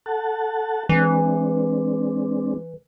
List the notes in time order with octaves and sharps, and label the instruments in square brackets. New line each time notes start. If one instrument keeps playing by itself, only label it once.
[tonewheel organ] A4 F#5 A5
[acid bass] E3 [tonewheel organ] G#3 C4 D4